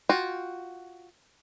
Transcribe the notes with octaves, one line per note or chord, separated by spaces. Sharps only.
F4 F#4 G5